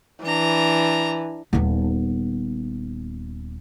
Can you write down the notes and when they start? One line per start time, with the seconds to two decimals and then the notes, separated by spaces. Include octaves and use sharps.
0.24 E3 D4 A#5
1.53 D#1 B3